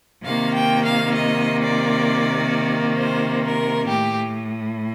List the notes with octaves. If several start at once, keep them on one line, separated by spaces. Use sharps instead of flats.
C3 D#3 A#3 F5
G5
F5
D#5
D5
C5
A#4
A2 G4